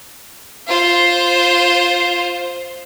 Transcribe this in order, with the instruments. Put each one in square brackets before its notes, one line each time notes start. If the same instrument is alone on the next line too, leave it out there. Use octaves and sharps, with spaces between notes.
[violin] F4 C5